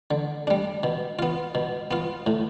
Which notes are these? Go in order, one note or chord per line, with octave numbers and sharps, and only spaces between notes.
D3
G3 D4
B2
B3 F4
B2
B3 F4
A2